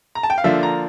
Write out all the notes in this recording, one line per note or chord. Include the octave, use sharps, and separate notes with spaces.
A#5
A5
G5
F5
D3 F3 A#3 D4 E5
A#5